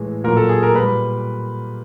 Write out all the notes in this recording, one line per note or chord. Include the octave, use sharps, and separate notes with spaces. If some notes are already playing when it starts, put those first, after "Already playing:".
Already playing: A2 E3 G#3
A#2 F#3 A#4
A4
G#4
A#4
A#2 G3 B4